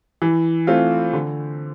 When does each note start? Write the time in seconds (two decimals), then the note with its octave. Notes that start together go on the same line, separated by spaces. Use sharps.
0.22 E3
0.67 A3 C4 F4
1.13 D3